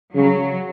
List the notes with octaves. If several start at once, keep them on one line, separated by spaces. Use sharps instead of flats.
C#3 F#3